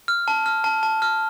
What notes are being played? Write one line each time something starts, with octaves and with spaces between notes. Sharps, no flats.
F6
A5
F6
A5
A5
F6